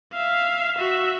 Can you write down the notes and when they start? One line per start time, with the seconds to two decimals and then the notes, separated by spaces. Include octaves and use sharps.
0.13 E5 F5
0.77 F#4 E5